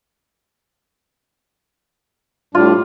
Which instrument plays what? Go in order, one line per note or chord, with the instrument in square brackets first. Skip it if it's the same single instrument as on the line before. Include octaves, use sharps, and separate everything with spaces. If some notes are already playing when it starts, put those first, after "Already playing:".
[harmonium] A2 G3 D4 [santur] F4